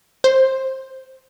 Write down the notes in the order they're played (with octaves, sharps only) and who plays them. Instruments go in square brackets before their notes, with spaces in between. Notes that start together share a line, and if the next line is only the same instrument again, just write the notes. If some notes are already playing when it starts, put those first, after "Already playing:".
[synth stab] C5